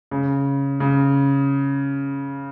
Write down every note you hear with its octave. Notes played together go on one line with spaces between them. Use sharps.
C#3
C#3